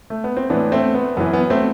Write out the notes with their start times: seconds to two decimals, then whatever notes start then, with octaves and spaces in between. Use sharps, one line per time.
0.10 A3
0.24 B3
0.37 C4
0.50 A2 E3 B3 D4
0.72 A3 C4
0.95 B3
1.17 F#2 E3 B3
1.33 B3
1.50 A3 C4